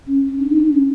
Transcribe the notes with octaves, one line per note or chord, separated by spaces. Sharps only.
C#4
C#4
D4
D#4
D4
C#4